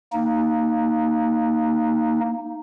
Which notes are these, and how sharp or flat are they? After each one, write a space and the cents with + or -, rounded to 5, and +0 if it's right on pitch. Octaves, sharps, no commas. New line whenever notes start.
A#3 +0 D#4 +0